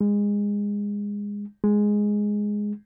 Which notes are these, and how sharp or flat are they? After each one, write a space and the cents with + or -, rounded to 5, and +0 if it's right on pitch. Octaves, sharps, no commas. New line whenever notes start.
G#3 -20
G#3 +0